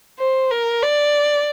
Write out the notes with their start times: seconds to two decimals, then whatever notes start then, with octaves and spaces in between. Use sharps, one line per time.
0.19 C5
0.51 A#4
0.83 D5